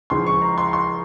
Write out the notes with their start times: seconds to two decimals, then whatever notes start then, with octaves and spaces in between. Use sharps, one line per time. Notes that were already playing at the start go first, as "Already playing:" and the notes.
0.10 C#2 C#3 F3 C6
0.27 C#6
0.42 A#5
0.58 C6
0.73 C6